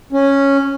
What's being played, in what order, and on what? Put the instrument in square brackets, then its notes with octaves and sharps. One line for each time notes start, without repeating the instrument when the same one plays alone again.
[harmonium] C#4